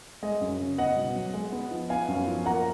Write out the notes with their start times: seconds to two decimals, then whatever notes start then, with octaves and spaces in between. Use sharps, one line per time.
0.23 G#3 D#5
0.41 F#2
0.59 C#3
0.78 B3 D#5 F#5
0.97 B2
1.15 F#3
1.34 G#3
1.52 B3
1.71 F3
1.90 B3 F5 G#5
2.08 F#2
2.27 F3
2.46 A#3 F#5 A#5